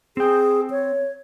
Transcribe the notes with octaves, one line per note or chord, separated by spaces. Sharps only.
C4 G#4 G5
C#5